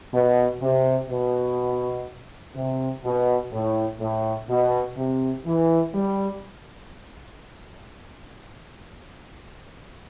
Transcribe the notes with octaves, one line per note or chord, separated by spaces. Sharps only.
B2
C3
B2
C3
B2
A2
A2
B2
C3
E3
G3